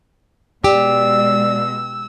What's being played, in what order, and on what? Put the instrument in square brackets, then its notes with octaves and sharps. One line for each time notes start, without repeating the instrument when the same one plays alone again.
[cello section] B2 G#3 [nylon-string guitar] G4 [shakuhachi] D5 [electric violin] E6